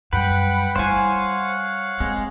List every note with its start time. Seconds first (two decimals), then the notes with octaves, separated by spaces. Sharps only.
0.13 F#2 G3 B4 F#5 G5
0.76 G3 E4 C5 C#5 F5 F#5 G#5
2.00 G#3 C4